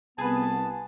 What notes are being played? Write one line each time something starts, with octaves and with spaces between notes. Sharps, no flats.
C2 B3 G#4 B4 A5